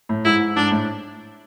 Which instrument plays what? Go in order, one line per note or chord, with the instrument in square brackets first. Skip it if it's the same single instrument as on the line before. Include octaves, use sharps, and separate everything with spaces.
[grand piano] A2
[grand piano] G#2 [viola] E4
[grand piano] G#2
[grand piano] G#2 [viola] D4
[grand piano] A2